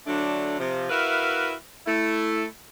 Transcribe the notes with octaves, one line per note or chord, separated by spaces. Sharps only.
D3 F#3 A3 D4
C3 F3
E4 F#4 A#4 B4 E5 F5
A3 E4